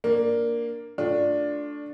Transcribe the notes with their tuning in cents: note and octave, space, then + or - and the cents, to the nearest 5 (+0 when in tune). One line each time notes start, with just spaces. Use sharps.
A#3 +0 D4 +0
A3 +0 D4 +0 F4 +20